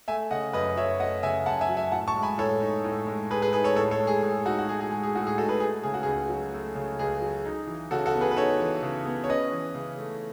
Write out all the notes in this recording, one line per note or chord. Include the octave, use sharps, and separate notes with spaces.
A3 E5 G#5
C#3 D#5 F#5
F#2 B4 D#5
F#3 C#5 E5
A3 D#5 F#5
C#3 E5 G#5
F#2 F#5 A5
E5 G#5
F#3
E5 G#5
A2 F#5 A5
A5 C#6
G#3
G#5 B5
A2 A4 C#5
D#4
A2
G#3
A2 G#4 B4
G#4 B4
D#4 G#4 B4
A4 C#5
A2 A4 C#5
A4 C#5
G#3
G#4
A2 G#4
D#4 F#4
F#4
A2 G#4
G#4
G#3 G#4
G#4
A2 F#4
G#4
D#4 F#4 A4
G#4 B4
A3 G#4
C#3 G#4
F#4
C#2 G#4
F#3
A3
C#3
C#2 G#4
F#3
D#4
E3
C#3 F#4 A4
F#4 A4
B3
G#4 B4
B4
D#4 A4 C#5
E3
C#3
B3
C#5
C#4 B4 D#5
E3
C#3
A3